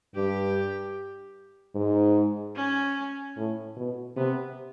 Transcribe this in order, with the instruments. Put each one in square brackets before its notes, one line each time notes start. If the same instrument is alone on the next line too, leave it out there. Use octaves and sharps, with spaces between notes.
[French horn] G2 [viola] G4
[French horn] G#2
[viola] C#4
[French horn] A2
B2
[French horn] C3 [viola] B3